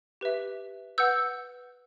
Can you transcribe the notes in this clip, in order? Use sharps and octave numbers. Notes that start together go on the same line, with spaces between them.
G4 B4 E5
B4 F#5 E6 G6